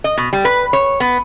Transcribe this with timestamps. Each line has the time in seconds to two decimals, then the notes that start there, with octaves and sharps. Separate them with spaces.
0.04 D#5
0.18 B2
0.33 G3
0.45 B4
0.73 C#5
1.00 B3